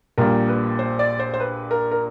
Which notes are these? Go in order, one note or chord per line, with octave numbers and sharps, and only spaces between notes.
A#1 A#2 G3 A#4
B4
C5
D5
C5
C5
B4
A#4
A#4